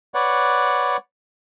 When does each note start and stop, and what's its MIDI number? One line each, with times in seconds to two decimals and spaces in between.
0.14 0.97 71
0.14 0.97 73
0.14 0.97 74
0.14 0.97 78